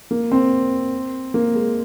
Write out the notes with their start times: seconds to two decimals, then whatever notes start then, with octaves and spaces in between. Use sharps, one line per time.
0.11 A#3
0.32 C4
1.34 A#3
1.55 G#3